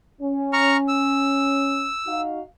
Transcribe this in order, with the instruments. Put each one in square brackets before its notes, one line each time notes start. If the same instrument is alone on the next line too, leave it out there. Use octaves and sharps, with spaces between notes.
[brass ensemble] C#4
[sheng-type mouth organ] A#5 C#6 F6
E6
[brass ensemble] D#4 F#4 F5